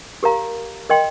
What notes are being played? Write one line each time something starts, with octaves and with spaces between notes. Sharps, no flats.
G4 A#4 F5 A#5
A#4 D#5 G5 C6